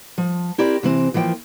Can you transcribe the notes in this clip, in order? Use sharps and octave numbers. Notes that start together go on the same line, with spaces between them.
F3
C4 E4 G4 A#4 D5
C3 E3 C4
E3 F3 A#3 F#5 G5